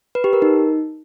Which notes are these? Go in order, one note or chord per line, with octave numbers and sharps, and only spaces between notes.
B4
G4
A#4
D#4